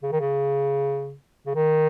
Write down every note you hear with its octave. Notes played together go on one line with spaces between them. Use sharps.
C#3
D#3
C#3
C#3
D#3